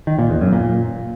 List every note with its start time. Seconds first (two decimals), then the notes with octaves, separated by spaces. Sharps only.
0.07 D#3
0.19 A#2
0.30 E2
0.41 F#2
0.53 A#2